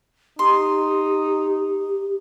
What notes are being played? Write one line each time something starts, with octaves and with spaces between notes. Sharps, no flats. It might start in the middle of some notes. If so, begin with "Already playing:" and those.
D#4 G4 C6